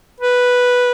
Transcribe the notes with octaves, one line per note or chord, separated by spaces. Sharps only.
B4